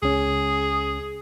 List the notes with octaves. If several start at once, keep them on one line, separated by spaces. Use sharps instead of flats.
C#2 C#4 G#4